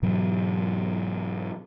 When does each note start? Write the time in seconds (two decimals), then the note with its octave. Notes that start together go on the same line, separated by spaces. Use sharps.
0.02 G#2 B2 E3 F#3